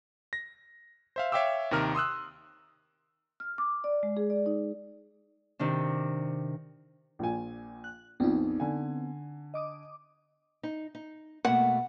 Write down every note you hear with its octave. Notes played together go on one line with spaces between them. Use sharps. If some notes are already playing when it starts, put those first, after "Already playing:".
A#6
C5 E5 F5
C#5 E5 F5 G5 D6 E6
D#2 C3 D#3 A#4 F6
C6 D#6 E6 F#6
F6
D6
D5
G#3
G#4
D5
D#4
C3 D#3 D4
A#1 A#2 G#5
F#6
A#1 F2 B3 C4 D#4
D3 G#5
D#5 D6 D#6
D#4
D#4
B2 A3 A#3 F#5